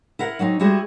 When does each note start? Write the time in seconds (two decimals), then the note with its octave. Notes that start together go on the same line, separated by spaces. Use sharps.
0.19 E4 A#4 F#5
0.39 F#3 C4 C#4 D#4
0.59 G3 G#3 E4 F#4 G#4